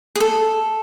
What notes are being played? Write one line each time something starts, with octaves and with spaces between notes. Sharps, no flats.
G#4
A4